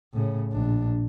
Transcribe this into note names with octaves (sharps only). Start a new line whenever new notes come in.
A2 C#3
A#1 D4